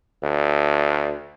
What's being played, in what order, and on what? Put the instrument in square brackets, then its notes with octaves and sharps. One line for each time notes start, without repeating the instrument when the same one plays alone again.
[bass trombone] D2